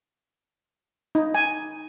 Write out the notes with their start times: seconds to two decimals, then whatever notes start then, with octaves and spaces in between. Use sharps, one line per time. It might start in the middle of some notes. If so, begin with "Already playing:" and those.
1.15 D#4
1.34 G#5